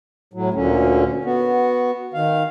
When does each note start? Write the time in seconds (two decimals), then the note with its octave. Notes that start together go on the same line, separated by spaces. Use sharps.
0.34 A2 F#3
0.54 D2 A#2 D3 C#4
1.25 B3 F#4
2.14 D#3 F5